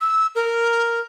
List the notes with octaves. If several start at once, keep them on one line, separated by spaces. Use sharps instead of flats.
E6
A#4